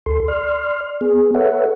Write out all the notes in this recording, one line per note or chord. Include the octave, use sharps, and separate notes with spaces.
D2 A4 C6
D5 C6 F6
B3 G#4
A4 B4 C#5 E5 F#5